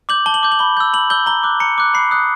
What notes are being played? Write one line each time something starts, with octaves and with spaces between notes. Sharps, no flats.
D6 G6 F#7
A5 G7
F#7
D6 G6
F#7
B5 G7
E6 G6
B5 F#7
E6 G6 G7
A#5 G7
D6 F#6
A#5 C#7
D6 F#6
B5 C7
D#6 F#6